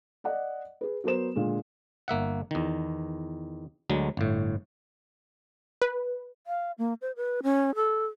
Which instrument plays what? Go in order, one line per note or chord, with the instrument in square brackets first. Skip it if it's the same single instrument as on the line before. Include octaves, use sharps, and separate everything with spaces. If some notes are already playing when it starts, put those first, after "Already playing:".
[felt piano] D5 D#5 F#5
G#4 B4
F#3 B3 A#4 C5 E7
A#2 D3 G#3
[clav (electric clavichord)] G1 A#3 E5 F#5
E2 D#3
D2 D3 F#3 G#3
G1 A2
[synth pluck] B4
[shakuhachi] F5
A#3
C5
B4
C#4
A4